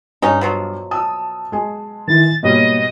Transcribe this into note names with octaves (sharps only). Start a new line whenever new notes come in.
G2 C#4 D#4
B2 F3 F#3
A5 D#6 E6
G#3 G#4
D#3 E3 E4 A6
G#2 B2 G3 A#3 C#5 D#5